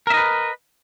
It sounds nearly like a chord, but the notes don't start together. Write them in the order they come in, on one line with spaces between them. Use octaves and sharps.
A#4 E5 D#5 B4